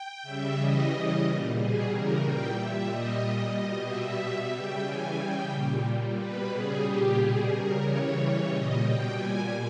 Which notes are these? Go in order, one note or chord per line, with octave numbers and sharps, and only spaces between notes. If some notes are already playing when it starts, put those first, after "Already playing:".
Already playing: G5
C#3 G3 E5
C#3 E3 G3 D#5
C#3 E3 G3
A#2 G3
B2 G3 G#4
C#3 E3 G3 A#4
A#2 G3 G5
A#2 G3 E5
A#2 G3 D#5
A#2 G3
B2 G3
B2 G3 E5
B2 G3
C#3 G3 G5
C#3 E3 G3 G#5
C#3 G3 G5
A#2 G3
A#2 G3
B2 G3 B4
C#3 G3 G#4
A#2 G3 G4
B2 G3 G#4
C#3 G3 A#4
C#3 E3 G3 C#5
C#3 E3 G3 C#5
A#2 G3 D#5
B2 G3 G5
A#2 G3 G#5